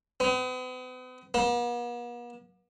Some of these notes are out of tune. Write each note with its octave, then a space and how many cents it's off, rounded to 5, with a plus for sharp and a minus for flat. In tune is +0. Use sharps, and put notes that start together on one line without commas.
B3 +45
B3 -45